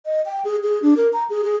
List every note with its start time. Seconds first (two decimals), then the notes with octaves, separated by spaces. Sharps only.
0.06 D#5
0.26 G5
0.45 G#4
0.63 G#4
0.82 D4
0.97 A#4
1.13 A#5
1.30 G#4
1.44 G#4